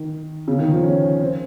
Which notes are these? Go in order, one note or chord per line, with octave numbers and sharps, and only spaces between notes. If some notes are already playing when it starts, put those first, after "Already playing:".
Already playing: D#3
C#3
D#3
F3
C#4
C#4
C4